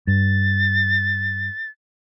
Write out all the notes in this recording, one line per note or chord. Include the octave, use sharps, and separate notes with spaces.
G2 A6